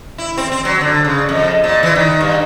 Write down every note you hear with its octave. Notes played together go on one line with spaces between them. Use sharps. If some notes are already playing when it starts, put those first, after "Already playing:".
E4
C4
C4
F#3
D3
C#3
F2
A#2
E3
D#3
G2